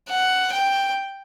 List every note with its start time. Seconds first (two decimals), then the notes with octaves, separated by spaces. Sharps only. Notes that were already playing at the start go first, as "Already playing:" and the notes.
0.10 F#5
0.53 G5